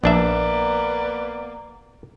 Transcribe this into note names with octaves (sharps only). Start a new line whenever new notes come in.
A#1 A#3 B3 D4 D5 E5